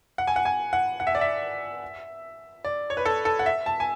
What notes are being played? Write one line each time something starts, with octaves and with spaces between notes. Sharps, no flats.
F#5
G#5
F#5
G#5
F#5
F#5
E5
D5
E5
D5
C#5
B4
A4
A4
F#5
E5
A5
G#5